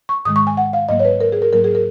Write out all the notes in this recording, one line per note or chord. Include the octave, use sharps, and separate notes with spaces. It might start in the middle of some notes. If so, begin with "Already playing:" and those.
C#6
G#2 D#3 G#3 D#6
C#6
G#5
F#5
F5
G#2 F#3 A#3 D#5
C#5
B4
A#4
G#4
A#4
G#2 F#3 A#3 A#4
G#4
A#4